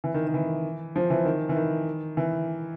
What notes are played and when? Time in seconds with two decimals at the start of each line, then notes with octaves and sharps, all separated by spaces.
0.04 E3
0.14 D#3
0.27 D#3
0.34 E3
0.96 F3
1.10 E3
1.25 D#3
1.49 E3
1.56 D#3
2.17 E3